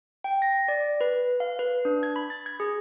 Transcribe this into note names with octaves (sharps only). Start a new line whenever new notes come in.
G5
A#6
D5
B4
F5
B4
D4
G#6
B5
A6
G#6
G#4